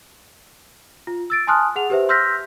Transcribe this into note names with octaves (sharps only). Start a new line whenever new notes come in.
F4
E6 A6 D7
G#5 A5 C6 D#6 F6 F#6
G#4 F#5 F7
G4 B4 C5 E5
C6 E6 F6 G6 A#6 B6